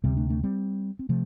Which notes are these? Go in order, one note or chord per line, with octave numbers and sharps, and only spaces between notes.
D2 C3 G3 C4
A3 D4
A3 D4
G3 C4
C4
C3 F3 A3